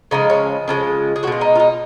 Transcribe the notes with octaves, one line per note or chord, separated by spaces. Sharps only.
C#3 F3 G#3 D#4
C#4
C#3 F3 G#3
G#4
B2 G#3 F4 F#4
D#4
F4
D#4